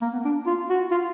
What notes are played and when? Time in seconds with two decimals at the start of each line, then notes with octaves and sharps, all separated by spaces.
0.02 A#3
0.13 B3
0.25 D4
0.46 F4
0.69 F#4
0.91 F4